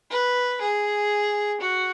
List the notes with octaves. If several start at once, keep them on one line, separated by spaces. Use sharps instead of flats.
B4
G#4
F#4